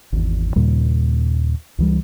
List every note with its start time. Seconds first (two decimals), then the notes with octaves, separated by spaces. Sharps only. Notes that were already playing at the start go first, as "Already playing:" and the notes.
0.12 G#1 E2
0.56 D#2 A#2 C#3 G3
1.78 C#2 E3 G3